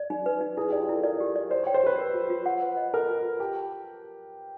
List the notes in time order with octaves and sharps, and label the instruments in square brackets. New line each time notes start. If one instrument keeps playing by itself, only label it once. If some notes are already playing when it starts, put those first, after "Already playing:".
Already playing: [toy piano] D5
D#4
B4
D#4
[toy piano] E4 [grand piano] G#4
[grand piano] G4
[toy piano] D5
[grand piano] F4
[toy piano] E4 [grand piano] A4
[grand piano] A#4 [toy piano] D5
[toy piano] G4
D5
[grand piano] C5 [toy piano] D5
[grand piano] C#5
[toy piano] G5
[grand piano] C5
[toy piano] G4 [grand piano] B4
[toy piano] A#4
F4
F4
F#5
B4
D#5
[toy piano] A4 [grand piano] A#4
[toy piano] F4
F4
[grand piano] G4 [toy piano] A5